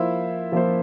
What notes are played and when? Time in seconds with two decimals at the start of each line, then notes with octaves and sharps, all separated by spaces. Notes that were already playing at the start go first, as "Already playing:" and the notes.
Already playing: F3 A#3 E4 F4 C5
0.52 F3 A#3 F4 C5